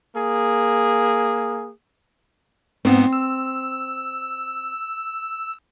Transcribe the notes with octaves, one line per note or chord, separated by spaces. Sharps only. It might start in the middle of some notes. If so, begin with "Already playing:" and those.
A#3 G#4
G#2 B3 C4
E6